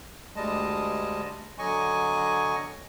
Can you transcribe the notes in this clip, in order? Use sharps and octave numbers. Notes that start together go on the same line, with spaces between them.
D2 G3 G#3 D#5 A5
D3 F#3 D#5 G#5 C#6